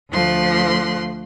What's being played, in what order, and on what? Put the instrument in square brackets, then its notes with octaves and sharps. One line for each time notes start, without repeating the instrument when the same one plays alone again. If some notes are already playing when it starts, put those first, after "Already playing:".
[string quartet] D2 F3 A3 C6 F#6